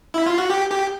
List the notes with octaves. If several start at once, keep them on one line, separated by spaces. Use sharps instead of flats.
E4
F4
F#4
G4
G4